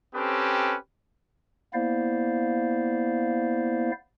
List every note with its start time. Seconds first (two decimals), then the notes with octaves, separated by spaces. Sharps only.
0.15 C4 C#4 G4 A4 B4
1.74 A#3 B3 E4 C5 D5 F5